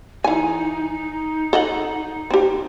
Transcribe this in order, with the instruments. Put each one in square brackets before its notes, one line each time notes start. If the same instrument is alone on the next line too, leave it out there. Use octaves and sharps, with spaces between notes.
[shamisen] E3 G#5 [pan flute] D#4
[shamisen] A4 D#5 F#5
C4 G4